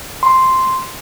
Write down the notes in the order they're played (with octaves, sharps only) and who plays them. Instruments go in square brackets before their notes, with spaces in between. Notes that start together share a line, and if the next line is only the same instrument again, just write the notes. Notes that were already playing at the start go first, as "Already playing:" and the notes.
[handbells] C6